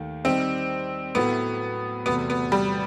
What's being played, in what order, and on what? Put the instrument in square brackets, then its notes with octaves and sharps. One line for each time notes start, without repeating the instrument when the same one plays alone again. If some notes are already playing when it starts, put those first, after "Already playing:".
Already playing: [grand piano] D#2 D#3 A3
[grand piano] D#3 G3 D#4 G4 [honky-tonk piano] C4
[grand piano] A2 F#3 A3 E4 [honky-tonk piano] B3
[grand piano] E2 C3 F#3 A3 [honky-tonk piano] B3
[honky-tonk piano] B3
G3